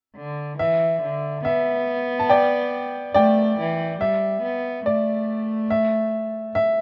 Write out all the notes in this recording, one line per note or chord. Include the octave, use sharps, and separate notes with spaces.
D3
E3 E5
D3
B3 E5
A5
D5 G5
A3 D5 G5
E3
G3 E5
B3
A3 D5
E5
E5